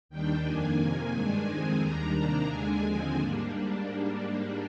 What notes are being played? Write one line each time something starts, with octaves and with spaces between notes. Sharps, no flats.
D#2 D#3 G3 D4 G5
F2 D#3 A#3 D4 G#5
F2 C3 D#3 A#3
G2 D#3 G#3 D4 G#5
F2 D#3 G#3 C4
D#2 D#3 G3 D4 A#5
C3 D#3 A#3 D4
D#2 D3 G#3 D4 G#5
D#2 D3 F3 G#3 C4
G#2 G3 A#3 D4